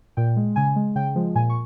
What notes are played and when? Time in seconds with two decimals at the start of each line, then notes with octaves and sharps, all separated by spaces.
0.17 A#2 G5
0.36 G#3
0.56 C#3 G#5
0.76 G#3
0.95 C#3 G5
1.15 F3 G#3
1.35 A#2 G#5
1.49 C#6